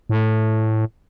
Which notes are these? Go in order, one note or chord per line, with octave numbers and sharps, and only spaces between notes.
A2